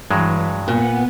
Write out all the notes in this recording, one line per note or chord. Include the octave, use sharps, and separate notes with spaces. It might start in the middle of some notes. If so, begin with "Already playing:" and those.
G2 E3 F#3 G#3
A#2 B3 F#5